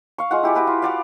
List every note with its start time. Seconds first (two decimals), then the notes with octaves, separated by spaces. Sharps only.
0.18 F5 C#6
0.31 G#3 F4 F#5
0.43 E4 G4 D5
0.55 F#4 G4 B4 D5
0.67 F4
0.82 F#4 D5 F5